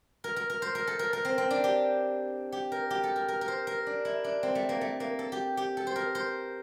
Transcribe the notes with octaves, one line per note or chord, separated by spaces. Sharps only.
A#4
A#4
A#4
C5
A#4
A4
A#4
A#4
C4
C4
D4
G4
G4
A#4
G4
A4
A#4
A#4
A#4
C5
A#4
D4
E4
D4
C4
A3
A#3
A3
A#3
A4
G4
G4
A4
C5
A#4
C5